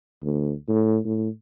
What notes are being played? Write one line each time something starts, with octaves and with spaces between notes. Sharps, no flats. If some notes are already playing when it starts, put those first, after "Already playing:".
D2
A2
A2